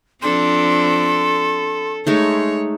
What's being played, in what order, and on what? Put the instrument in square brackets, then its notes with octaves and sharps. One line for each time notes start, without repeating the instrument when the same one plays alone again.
[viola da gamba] F3 C4 D4 [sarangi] A4 [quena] C6
[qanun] G#3 A3 D#4 [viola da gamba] C#5